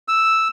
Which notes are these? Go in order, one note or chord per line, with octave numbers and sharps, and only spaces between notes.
E6